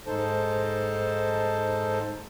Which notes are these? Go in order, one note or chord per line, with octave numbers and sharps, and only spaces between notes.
G#2 D#4 A4 C5 A5